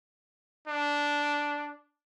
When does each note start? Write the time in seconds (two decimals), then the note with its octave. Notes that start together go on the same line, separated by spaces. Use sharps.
0.67 D4